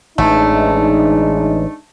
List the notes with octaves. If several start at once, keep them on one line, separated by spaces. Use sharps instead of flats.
A1 E3 G#3 A3 D4 D#4